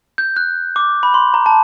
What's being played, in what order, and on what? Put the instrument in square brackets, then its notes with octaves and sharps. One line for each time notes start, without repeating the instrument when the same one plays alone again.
[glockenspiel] G6
F#6
D6
B5
C6
A#5
A5